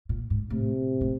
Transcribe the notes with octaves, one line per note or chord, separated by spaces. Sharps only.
A#2
G#2
A2 C3
A2